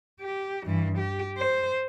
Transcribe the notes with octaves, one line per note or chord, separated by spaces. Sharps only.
G4
G2 E3
G4
C5